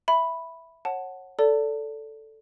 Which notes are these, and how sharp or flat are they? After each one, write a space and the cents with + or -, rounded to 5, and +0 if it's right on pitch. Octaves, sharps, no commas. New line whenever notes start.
E5 +0 B5 +0
C#5 -25 F#5 +0 A5 +0
A4 +0 D5 -25 A5 +35